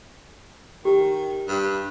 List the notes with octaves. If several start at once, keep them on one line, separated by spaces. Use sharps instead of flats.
D#3 G4
G2